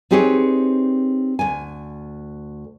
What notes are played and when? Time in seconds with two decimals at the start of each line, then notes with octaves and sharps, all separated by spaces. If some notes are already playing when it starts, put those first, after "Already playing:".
0.11 C4 D#4 G4 G#4 B4 C#5
1.39 D2 G#5